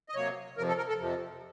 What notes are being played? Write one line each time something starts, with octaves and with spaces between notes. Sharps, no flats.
D#5
C3 F#3 A#3 C#5
F2 C3 F3 A#4
A4
A#4
A4
F2 C3 F3